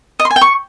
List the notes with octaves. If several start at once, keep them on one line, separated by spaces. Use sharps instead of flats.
D#5
C6
G#5
G5
C#6